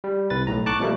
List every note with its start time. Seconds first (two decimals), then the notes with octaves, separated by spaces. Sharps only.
0.04 G3
0.30 C2 B4 A6
0.47 B1 A2 A#5
0.66 A5 C#6 D6 F#6
0.80 B2 F3 G3 A3 A#3